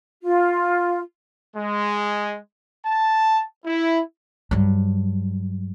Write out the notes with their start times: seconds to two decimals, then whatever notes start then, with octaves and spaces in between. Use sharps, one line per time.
0.23 F4
1.57 G#3
2.86 A5
3.66 E4
4.51 G2 F#3